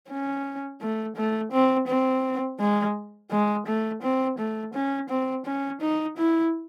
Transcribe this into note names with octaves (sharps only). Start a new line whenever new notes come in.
C#4
A3
A3
C4
C4
G#3
G#3
A3
C4
A3
C#4
C4
C#4
D#4
E4